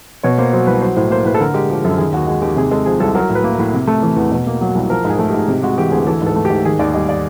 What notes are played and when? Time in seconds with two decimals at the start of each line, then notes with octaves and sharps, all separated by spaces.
0.23 B2 C#5
0.38 A#3 C5
0.53 F#3 C5
0.67 C2 B4
0.81 F#3 C5
0.96 A2 C5
1.10 A#3 C5
1.25 A2 B4
1.34 A4
1.40 D3 A#4
1.54 G#3 G4
1.70 F3 G4
1.85 F#2 A4
1.98 D#3 G#4
2.12 D#2 F#4
2.27 G#3 F#4
2.42 D#2 G4
2.56 C3 G#4
2.71 G#3 A4
2.86 F3 G#4
3.00 C2 A4
3.15 F#3 A#4
3.29 A2
3.35 B4
3.44 A#3
3.54 A#4
3.59 A2
3.73 C3
3.88 A3
4.03 E3
4.17 E2
4.31 B2
4.47 A#3
4.61 F#3
4.75 C2
4.90 F3 A#4
5.05 G#2
5.10 G#4
5.19 A3
5.30 G#2 G4
5.48 C3 G4
5.63 G#3 F#4
5.78 E3 G4
5.91 D2 G#4
6.07 E3 A4
6.22 G#2 A4
6.36 A3
6.45 G4
6.50 G#2
6.65 D#3 G#4
6.79 D#2 D5
6.94 G3 D#5
7.09 D5